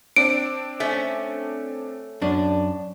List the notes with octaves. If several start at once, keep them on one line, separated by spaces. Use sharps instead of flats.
C4 D4 D7
A3 C#4
F#2 D4